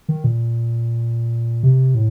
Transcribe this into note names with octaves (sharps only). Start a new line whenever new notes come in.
D#3
A#2
C3
A2